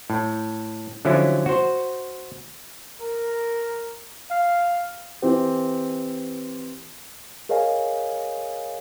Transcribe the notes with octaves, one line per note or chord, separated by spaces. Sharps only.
A2
D3 F3 F#3 C#4 E4
F#4 C5
A#4
F5
E3 C4 G4
G#4 A#4 C#5 D#5 F5 G#5